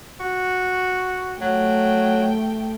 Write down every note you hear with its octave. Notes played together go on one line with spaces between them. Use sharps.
F#4
F#3 A3 G5